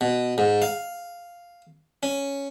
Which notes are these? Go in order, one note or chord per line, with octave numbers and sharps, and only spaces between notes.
B2
G#2
F5
C#4